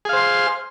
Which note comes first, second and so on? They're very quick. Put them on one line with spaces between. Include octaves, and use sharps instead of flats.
G#4 F5 C5 C6